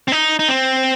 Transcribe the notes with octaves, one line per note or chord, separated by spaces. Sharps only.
C4
D#4
D#4
C4